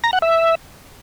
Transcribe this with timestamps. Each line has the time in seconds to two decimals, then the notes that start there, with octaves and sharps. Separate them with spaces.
0.04 A#5
0.13 F#5
0.22 E5